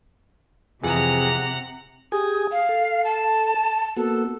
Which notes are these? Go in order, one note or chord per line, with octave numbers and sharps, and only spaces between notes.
F2 C3 E3 G#4 F#5 A#5
G4 G#4 G#5 D#6
F5
A4
A5
A#3 B3 F#4 A4